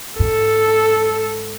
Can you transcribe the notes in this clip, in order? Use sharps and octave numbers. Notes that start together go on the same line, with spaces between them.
G#2 A4